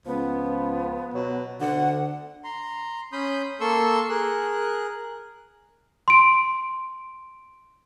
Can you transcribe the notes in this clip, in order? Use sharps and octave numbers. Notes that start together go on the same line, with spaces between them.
C#2 F3 B3
B2 F#3
D2 D3 F#5
A#5 C6
C#4 B5 C6 D#6 G6
A#3 A4 C6 C#6 E6
G#4 A#4 F#6
C6 D7